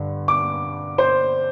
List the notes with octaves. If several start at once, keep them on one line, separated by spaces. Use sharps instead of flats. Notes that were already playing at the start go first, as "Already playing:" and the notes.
Already playing: G2 D3
D6
C5